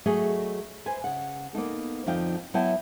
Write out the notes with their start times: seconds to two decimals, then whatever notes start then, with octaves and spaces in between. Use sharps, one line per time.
0.06 F#3 A3 G#4 C#5 D#5
0.86 B4 C5 G#5
1.04 C#3 F#5
1.53 A#3 B3 D#4 A4
2.06 F2 D3 F3 D#4 F5 G5
2.54 F#3 B3 E4 F#5 G5 A5